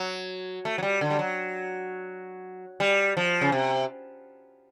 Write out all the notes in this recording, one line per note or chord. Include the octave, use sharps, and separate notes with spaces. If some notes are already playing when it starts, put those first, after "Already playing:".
Already playing: F#3
A3
F#3
G3
D3
G3
F#3
G3
F3
C#3
C3